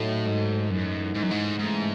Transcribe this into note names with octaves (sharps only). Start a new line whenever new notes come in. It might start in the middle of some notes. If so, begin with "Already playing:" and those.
Already playing: A2 F#3 A3 D#4 A4
G#2
F#2 A2 E3 G#3 D#4
G#2
F#2
G#2
G#2 C#3 E3 A3